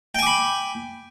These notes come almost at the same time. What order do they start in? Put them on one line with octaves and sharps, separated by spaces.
G5 G#5 D6 B5